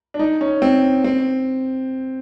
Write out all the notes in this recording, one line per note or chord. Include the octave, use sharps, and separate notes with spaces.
D4
D#4
C#4
C4
C4